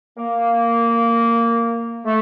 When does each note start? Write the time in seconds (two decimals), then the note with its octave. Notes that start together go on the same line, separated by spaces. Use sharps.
0.17 A#3
2.05 A3